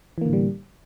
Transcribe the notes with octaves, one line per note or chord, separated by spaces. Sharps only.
A2 D3 E3 G3 A#3